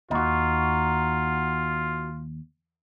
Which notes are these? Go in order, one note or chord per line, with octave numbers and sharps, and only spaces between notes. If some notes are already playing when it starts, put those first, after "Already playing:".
D#2 D#4 F4 F#4